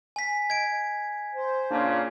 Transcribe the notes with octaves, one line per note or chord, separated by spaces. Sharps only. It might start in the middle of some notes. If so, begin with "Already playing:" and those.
G#5 B6
D#5 G#6 D7
C5
A#2 C#3 D4 F4 A5